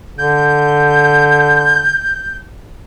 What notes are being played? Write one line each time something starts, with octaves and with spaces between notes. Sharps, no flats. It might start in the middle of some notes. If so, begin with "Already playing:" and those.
D3 G6